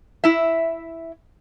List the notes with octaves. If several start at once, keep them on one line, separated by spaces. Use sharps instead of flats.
E4 E5